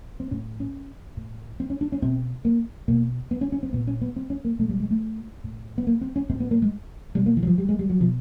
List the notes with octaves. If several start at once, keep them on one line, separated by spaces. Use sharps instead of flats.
C4
A2 C#4
C#4
A2
C4
C#4
D4
C#4
B2 C4
A#3
B2 A#3
B3
C#4
C#4
C4
A#2 B3
C#4
B3
C4
C#4
A#3
A#2 A3
G3
G#3
A3
A2
B3
A#3
C4
C#4
A2 C4
B3
A#3
G#3
B2 G3
A#3
E3
F#3
F3
G3
G#3
G3
F#3
B2 F3